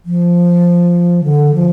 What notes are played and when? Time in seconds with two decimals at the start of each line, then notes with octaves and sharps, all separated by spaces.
0.05 F3
1.24 D3
1.54 F3